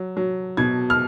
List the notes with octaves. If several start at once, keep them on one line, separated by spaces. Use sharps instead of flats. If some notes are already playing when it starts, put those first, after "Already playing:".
Already playing: F#3
F#3
B2 G#6
F6